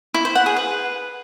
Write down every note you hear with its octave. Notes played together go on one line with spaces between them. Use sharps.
E4
C5
F#5
G#4
B4